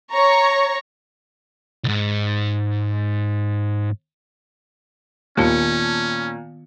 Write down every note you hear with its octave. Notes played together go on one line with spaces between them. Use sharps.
C#5 A#5 C#6
C2 G#2
D#2 A#2 D#3 B3 C#4 F4 A5 C#7